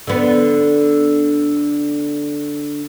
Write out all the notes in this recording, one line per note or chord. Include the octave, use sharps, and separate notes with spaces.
D3 B3